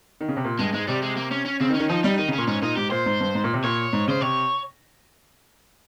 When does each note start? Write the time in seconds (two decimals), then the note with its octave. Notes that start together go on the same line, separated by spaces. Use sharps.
0.21 D#3
0.28 C#3
0.37 C3
0.45 A#2
0.59 G2 G#3
0.73 G#2 G#3
0.88 C3 G3
1.02 G#3
1.17 A#3
1.31 C#4
1.45 C#4
1.60 C#3 C4
1.70 D#3
1.75 C#4
1.80 D#3
1.90 F3 D#4
2.04 G3 D#4
2.18 D#3 D#4
2.28 C#3
2.33 A#2 C#4
2.48 G#2 C#4
2.62 A#2 D#4
2.76 G#2 G4
2.91 A#2 C5
3.06 G#2
3.21 G2
3.35 G#2
3.44 A#2
3.54 C3
3.64 A#2 C#5
3.93 G#2
4.08 C#3 C5
4.21 C3 C#5